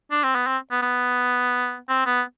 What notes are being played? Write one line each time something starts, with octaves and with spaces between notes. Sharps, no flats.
D4
C4
B3
C4
B3
B3
C4
B3